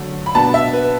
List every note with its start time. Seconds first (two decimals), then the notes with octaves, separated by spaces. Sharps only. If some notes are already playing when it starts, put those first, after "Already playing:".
Already playing: D3 F#3 A3
0.26 B5
0.34 B2 B3 D4 A5
0.54 E5
0.73 B4